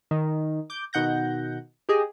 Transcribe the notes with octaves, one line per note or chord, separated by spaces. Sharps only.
D#3
D6 G6
B2 D#3 F#5 G6 A#6
G4 G#4 D#5